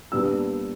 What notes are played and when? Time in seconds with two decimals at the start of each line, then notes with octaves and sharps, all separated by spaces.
0.12 A#2 G3 B3 D4 E6